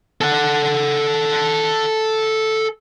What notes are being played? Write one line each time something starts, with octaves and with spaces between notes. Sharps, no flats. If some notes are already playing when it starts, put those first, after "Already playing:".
A4 F#5